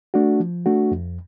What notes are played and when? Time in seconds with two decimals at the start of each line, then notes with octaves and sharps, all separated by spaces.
0.14 A3 D4 F#4
0.40 F3
0.66 A3 D4 F#4
0.91 F2